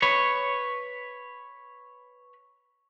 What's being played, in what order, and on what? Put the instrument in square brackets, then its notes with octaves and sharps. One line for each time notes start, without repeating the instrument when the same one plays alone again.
[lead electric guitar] B4 C#5